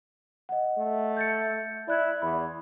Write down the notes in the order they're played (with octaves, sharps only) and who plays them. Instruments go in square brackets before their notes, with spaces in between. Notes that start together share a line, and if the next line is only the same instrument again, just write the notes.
[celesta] D#5 F#5
[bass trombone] A3
[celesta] G6 A6 C#7
[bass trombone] E4 [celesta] D5 F#6 G#6
[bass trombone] E2 [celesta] B5